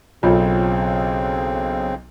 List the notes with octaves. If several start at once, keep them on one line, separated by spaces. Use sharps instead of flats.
B1 C#3 C4 F4 A4 C#5